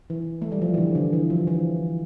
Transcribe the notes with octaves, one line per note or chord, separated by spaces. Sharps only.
E3
A3
G3
F3
E3
D3
D3
E3
F3
E3